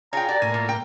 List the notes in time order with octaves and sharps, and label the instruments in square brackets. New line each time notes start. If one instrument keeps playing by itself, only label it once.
[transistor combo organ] F4 G#4 [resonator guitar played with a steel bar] C#5 G5 [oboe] A#5
[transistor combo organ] F#4 G4 A4 [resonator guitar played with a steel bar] D5
[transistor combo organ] A2 A#3 [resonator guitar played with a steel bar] G#5
[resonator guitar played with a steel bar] A#2
G5